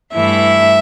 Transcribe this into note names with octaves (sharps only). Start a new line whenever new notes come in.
G2 E3 A3 E4 E5